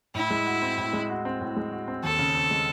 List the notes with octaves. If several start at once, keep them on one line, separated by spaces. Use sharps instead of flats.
A2 E4
G#3
F#4
C4
A2
G#3
F#4
C4
A2
G#3
F#4
C4
D#2 A4
C#3
C4
G#3